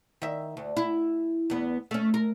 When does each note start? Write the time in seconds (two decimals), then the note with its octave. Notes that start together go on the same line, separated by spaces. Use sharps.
0.22 D#3 E5
0.57 D2
0.77 E4
1.50 E2 B3
1.91 A3 C#4
2.14 A#4